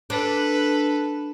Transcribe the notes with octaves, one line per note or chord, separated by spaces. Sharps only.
D4 A4 B4